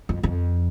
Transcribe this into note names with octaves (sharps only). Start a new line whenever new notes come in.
F2
F2